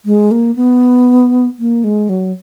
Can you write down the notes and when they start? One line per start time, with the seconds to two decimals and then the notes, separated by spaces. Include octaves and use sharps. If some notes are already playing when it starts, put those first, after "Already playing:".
0.05 G#3
0.31 A#3
0.56 B3
1.59 A#3
1.84 G#3
2.09 F#3